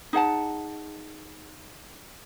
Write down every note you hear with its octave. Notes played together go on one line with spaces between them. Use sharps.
D#4 G#4 F#5 A5